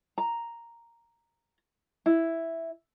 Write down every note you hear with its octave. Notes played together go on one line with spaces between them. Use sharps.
A#5
E4